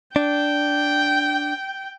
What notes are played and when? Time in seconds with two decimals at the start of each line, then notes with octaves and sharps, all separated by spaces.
0.16 D4 G5